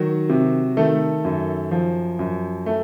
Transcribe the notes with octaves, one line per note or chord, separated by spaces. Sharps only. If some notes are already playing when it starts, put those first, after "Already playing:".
Already playing: D#3 F#3 F#4
C3
D#3 A3 A4
F#2
F3
F#2
A3